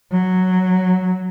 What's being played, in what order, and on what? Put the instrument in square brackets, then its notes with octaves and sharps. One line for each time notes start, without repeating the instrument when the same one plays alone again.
[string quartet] F#3